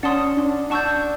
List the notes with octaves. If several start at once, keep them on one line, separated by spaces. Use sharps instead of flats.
C#4 D5 F#5 A5 C6 D#6
D4
D4 F#5 A5 C#6 E6 G6